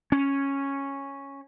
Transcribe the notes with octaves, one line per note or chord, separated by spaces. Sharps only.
C#4